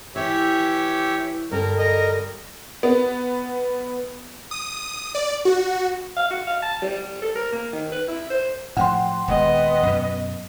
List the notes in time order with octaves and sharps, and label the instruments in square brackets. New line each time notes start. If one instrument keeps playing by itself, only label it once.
[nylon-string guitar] E3 [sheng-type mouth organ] G4 C#5 E5
[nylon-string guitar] G2 D3 A4 [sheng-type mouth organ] A#4
[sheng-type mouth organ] A#4 D#5
[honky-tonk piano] B3
[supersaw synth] D#6
D5
F#4
[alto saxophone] F5
F#4
F5
A5
G3
A4
A#4
A#3
D#3
B4
E4
C5
[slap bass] A2 F3 [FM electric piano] F#5 G5 C6
[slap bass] D#1 G#3 [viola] B3 D#5
[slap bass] F#2 B2